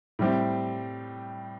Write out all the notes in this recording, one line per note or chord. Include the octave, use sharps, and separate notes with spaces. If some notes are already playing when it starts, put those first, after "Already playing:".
A2 G3 C4 G4